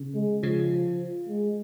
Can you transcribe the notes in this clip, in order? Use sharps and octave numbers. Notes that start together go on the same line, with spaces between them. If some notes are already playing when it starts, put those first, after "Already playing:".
Already playing: C#3
G#3
C#3 F3
G#3